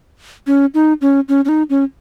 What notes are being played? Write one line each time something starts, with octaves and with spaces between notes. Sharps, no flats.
C#4
D#4
C#4
C#4
C#4
D#4
C#4